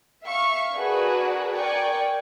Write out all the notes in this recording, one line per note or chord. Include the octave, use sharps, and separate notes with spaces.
E5 F5 C#6
D4 F#4 G#4 A#4 B4
A#4 D5 G5 G#5 C#6